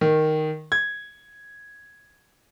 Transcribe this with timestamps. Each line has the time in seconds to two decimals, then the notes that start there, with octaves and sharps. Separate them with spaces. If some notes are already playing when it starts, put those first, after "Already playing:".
0.01 D#3
0.72 G#6